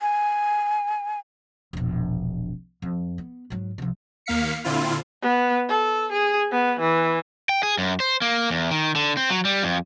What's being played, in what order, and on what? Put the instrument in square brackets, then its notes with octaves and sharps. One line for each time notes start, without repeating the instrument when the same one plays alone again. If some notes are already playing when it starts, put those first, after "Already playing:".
[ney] G#5
[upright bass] E1 A#1
F2
B3
G#2 F#3
C2 F3
[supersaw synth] D#2 A#3 F5 B6 C#7
A#2 D3 C4 E4 F4
[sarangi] B3
A4
G#4
B3
E3
[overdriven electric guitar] G5
G#4
F#2
C5
A#3
E2
D#3
D3
C4
F#3
G3
F2